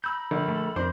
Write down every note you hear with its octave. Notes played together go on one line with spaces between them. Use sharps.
A#5 B5 E6 G6
A#1 D3
A3 A4
F2 D4 A#4 C5